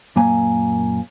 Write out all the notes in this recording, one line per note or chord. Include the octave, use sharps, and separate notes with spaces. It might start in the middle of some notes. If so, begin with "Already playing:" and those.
F#2 A#2 A#3 C#5 G#5 A#5